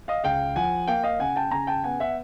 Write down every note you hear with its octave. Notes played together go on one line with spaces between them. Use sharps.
D#5 F5
C#2 F5 G5
F3 F#5 G#5
A#3 F5 G5
D#5 F5
C#3 F#5 G#5
G5 A5
C#3 G#5 A#5
G5 A5
B3 F#5 G#5
E5 F#5